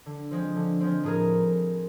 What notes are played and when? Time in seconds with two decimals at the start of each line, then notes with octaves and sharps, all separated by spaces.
0.06 D3
0.31 F3 G#3 C4
0.56 D3
0.81 F3 G#3 C4
1.04 A2 G#4 A#4